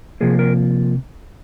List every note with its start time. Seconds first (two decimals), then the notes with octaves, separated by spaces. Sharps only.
0.21 C3 F3 A#3 G#4
0.39 A#4